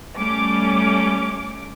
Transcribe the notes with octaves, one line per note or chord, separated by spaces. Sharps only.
G3 A3 C#4 D6